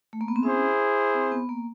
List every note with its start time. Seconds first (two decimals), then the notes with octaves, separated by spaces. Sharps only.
0.13 A3
0.21 A#3
0.28 B3
0.36 C4
0.43 C#4 E4 G#4 C5
1.14 C4
1.32 B3
1.49 A#3